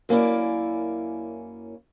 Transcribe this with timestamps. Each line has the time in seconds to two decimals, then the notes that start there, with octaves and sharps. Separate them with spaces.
0.09 F#2 A#3 C#4 E4 D5